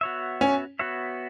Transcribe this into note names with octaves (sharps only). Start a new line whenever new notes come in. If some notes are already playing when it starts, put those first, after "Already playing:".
B3 F#4 C#5 E5
C#4
B3 F#4 C#5 E5